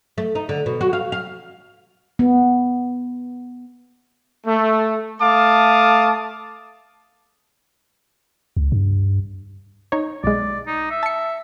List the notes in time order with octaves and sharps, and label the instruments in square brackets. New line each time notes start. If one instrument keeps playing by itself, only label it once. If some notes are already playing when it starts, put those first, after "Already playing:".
[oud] A3
D#4
D3
B2
F#4
F5
F5
[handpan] B3
[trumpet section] A3
A3 F5 A5 D6 D#6
[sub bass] C#2
G2
[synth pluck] D#4 C#5
[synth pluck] B1 G#3 [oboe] D5
[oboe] D#4
E5
[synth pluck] A5 C#7